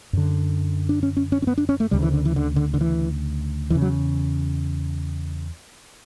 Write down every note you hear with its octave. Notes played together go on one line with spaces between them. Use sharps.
F#2 D3
D4
C#4
C#4
C#4
C#4
B3
D4
C#4
A3
D2 C#3 G3
E3
D3
E3
D3
D3
D3
E3
E2 C#3 E3
F#3